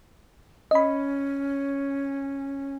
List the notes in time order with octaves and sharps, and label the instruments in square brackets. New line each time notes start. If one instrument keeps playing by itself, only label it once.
[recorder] C#4 [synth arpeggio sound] D#5 B5